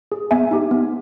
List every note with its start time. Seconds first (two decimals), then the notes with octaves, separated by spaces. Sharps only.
0.12 G#4
0.31 B3 E5 G#5
0.51 D#4 G4
0.71 B3